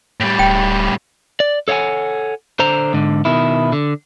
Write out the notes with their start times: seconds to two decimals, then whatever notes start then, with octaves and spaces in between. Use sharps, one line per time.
0.20 A2 G3
0.39 D1 G5
1.40 D5
1.68 A4 C#5 F5 F#5 G#5
2.59 D3 C5 A#5
2.93 G#2 D3
3.25 B2 D#3 E4
3.72 D3